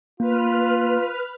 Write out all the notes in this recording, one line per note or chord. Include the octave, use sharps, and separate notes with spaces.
A#3 F4 B4 F6